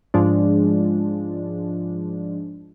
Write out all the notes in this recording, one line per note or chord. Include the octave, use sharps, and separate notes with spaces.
G#2 F3 G#3 D4